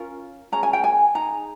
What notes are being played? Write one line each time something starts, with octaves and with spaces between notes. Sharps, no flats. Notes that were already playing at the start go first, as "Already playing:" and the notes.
Already playing: C#4 F4 A#4
C#4 G#4 A#5
G#5
G5
G#5
D#4 G#4 A#5